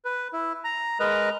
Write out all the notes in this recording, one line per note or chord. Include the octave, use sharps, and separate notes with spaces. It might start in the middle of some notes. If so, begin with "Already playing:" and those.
B4
E4
A#5
G#3 A#4 B4 D#5 A#5